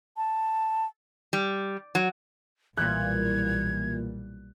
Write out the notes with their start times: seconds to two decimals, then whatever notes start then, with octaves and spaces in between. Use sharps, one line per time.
0.17 A5
1.33 G3
1.95 F#3
2.77 B1 A#2 E3 G3 F#6 G#6